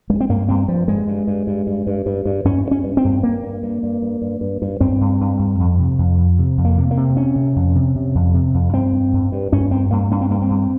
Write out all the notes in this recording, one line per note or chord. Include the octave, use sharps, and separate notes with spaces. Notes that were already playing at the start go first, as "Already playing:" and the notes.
G2 G#3
C4
G2 A#3
G2 C4
G2 F3
G2 G#3
G2
G2
G2
G2
G2
G2
G2
G2 C#4
G2
C#4
G2
C4
G2
G2 A#3
G2
G2
G2
G2
G2
G2
G2
G2 C4
G2
G2
G2
F2
C3
F2
F2
C3
F2
A#3
C3
A#3
C3
C3 C#4
C3
F2
C3
C3
F2
C3
F2
G2 C4
G2
G2
G2
G2 C#4
G2 C4
G2 A#3
G2 C#4
C4
G2 A#3
C4
G2